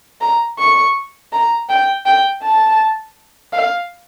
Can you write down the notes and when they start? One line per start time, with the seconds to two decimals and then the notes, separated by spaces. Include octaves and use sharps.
0.21 A#5
0.59 C#6
1.32 A#5
1.70 G5
2.06 G5
2.43 A5
3.53 F5